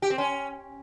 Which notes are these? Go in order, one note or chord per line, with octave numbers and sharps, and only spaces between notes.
G4
C4
C#4